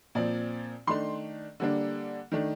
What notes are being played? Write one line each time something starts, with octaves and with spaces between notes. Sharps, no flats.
A#2 F3 C4 D5
D#3 A3 D4 C6
D3 G3 A#3 D4
D#3 A3 D4